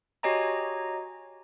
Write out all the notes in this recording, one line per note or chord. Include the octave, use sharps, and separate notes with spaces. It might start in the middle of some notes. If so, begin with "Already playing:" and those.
F#4 G4 C#5 D#5 G#5 A#5